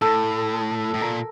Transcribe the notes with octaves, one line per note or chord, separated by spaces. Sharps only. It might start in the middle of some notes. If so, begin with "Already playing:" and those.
A2 A4
A2
A#2 A#4